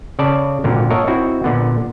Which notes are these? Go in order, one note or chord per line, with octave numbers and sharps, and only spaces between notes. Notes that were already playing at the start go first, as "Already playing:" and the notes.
C#3 D5 A5
G#1 A#2 D3 A#4
A#4 C#5 D#5 E5 F#5 A5
C4 D#4 E4 F#4
A#2 D3 B3